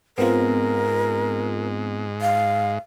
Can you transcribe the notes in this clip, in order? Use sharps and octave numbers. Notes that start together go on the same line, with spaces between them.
G#2 B3 C4 F4 A#4
F5